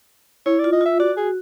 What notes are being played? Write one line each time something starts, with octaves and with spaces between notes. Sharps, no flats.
E4 C#5
D5
F4
D#5
F4 E5
F#4 D5
G#4